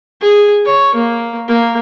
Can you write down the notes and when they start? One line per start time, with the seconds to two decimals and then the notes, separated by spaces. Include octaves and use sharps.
0.21 G#4
0.66 C#5
0.95 A#3
1.48 A#3